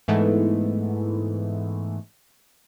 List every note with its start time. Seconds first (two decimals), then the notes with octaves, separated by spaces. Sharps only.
0.08 G#2 E3 G#3 A3 B3